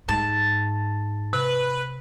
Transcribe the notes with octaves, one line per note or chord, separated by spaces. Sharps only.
G#2 A5
C3 B4